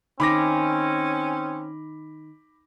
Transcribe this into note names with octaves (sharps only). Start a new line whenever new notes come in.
D#3 C4 C#4 B5 D6 A#6